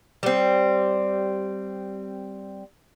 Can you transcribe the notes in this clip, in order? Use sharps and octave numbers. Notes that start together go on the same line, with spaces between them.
G3 C4